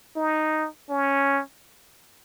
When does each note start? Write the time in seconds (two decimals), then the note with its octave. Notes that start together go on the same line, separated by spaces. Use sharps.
0.16 D#4
0.89 C#4